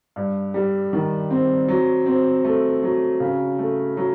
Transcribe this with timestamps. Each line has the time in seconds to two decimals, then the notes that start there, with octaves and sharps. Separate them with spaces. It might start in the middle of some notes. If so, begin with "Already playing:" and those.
0.16 G2
0.54 G3
0.93 D#3
1.31 C4
1.68 F#3
2.06 C4
2.44 A3
2.83 F#3
3.20 C#3
3.59 A3
3.97 F#3